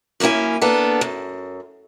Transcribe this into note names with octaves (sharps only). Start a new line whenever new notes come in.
F#2 A#3 C#4 E4 G#5
A#3 B3 D4 A4
F#2